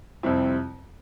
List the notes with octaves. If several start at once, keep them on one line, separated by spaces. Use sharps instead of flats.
F2 C3 G3 C4 E4